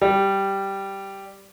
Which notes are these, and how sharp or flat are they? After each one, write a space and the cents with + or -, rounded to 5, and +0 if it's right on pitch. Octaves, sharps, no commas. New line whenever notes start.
G3 -5